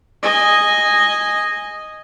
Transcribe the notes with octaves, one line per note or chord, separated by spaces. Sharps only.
D#5 G#5